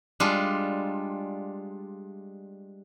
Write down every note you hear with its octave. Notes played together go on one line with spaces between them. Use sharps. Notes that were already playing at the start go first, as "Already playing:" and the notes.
G3 G#3 D4 F4